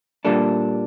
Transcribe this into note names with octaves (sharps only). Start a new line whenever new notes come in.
A#2 G3 A#3 D4 A4